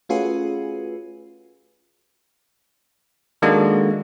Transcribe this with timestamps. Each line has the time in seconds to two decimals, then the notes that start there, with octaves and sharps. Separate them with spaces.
0.09 A3 C#4 F4 F#4 G#4 B4
3.42 D#3 G#3 A#3 D4 F#4 A4